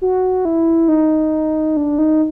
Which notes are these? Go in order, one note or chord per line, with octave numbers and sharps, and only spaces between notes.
F#4
E4
D#4
D4
D#4